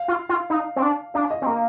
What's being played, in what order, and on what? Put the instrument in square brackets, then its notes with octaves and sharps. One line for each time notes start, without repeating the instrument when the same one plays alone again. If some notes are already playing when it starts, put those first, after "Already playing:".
Already playing: [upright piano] F5
[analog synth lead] F4
F4
D#4
C4
D4
[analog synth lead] D4 [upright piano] F5
[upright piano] D#5
[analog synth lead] C4
[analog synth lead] A#3 [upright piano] A#4